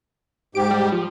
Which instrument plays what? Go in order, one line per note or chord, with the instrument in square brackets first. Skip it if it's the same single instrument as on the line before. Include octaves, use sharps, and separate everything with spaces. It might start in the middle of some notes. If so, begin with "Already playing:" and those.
[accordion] G#2 G4 [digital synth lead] D7
[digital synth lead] G3
F3